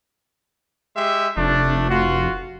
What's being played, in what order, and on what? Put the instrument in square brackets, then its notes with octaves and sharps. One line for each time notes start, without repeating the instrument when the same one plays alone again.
[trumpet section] G#3 G4 E5
[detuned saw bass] F1 [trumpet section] A3 D4
[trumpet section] F4 F#4